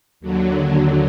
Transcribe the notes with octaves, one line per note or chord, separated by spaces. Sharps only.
D#2 D3 F#3